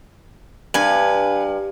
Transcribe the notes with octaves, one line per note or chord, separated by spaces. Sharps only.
G2 B4 G#5